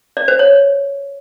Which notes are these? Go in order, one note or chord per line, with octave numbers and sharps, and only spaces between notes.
D5
C5
C#5